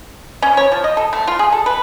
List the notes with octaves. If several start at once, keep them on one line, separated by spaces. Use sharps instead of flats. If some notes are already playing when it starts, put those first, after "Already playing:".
C#4
C#5
F3
D#5
A4
A3
F4
G#4
A4
B4